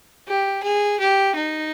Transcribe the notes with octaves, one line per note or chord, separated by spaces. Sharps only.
G4
G#4
G4
D#4